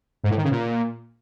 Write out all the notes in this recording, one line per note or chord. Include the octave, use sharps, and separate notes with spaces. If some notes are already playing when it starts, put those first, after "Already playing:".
G#2
A2
D#3
C#3
A#2